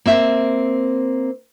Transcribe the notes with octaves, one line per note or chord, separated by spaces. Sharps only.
A#3 C4 E5